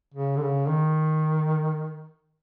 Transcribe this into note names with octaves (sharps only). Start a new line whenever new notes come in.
C#3
D3
C#3
D#3